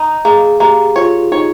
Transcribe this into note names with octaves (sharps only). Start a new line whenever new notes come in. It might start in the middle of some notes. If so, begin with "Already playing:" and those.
Already playing: D#4
A#3 G#4
A#3 G4
F4 C#5
D#4 C#5